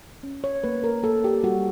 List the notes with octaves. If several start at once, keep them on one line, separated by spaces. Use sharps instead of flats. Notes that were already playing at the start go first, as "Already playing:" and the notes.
C#4
C#5
A#3 B4
A#4
A#3 A4
G4
G3 F#4